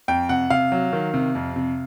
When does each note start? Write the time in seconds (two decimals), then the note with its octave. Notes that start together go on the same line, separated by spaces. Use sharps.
0.08 F2 G5
0.29 C3 F#5
0.50 C3 F5
0.72 F#3
0.93 D#3
1.14 C3
1.35 F2
1.56 C3